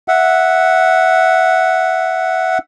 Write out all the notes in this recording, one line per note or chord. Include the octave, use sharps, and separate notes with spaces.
E5 F#5